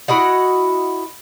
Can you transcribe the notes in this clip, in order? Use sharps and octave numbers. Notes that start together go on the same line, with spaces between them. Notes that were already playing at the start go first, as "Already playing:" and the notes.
E4 F#4 D#5 F#5